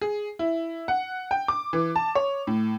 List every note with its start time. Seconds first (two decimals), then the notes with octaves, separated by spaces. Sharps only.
0.01 G#4
0.39 E4
0.88 F#5
1.31 G5
1.48 D6
1.73 E3
1.96 A5
2.15 C#5
2.47 A2